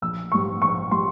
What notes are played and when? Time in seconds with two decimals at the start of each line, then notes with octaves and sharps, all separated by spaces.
0.02 A#1 E6
0.32 G#2 G3 C#6
0.62 A#1 C#6
0.91 G3 C6